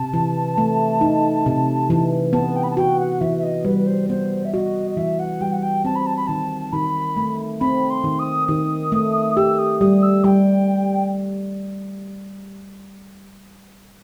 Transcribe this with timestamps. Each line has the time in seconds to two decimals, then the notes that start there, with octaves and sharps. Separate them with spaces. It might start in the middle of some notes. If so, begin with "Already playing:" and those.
Already playing: C3 A5
0.14 E3
0.58 A3
1.01 D#4
1.46 C3
1.90 E3
2.33 B3 A5
2.56 G5
2.63 B5
2.71 A5
2.77 F#4 G5
2.99 F#5
3.21 E3 E5
3.38 E5
3.43 D#5
3.65 G3 B4
3.87 C5
4.09 B3 C5
4.45 E5
4.53 F#4 D#5
4.91 D#5
4.97 E3 E5
5.19 F#5
5.41 G3 G5
5.52 F#5
5.63 G5
5.85 C4 A5
5.96 B5
6.06 A5
6.17 B5
6.27 D#3 A5
6.73 D#3 B5
7.17 A3
7.61 C4 B5
7.90 C6
8.04 D#3
8.19 D#6
8.48 D#3 D#6
8.92 A3
9.36 G4 E6
9.58 D#6
9.80 G3 D#6
10.03 E6
10.24 G3 G5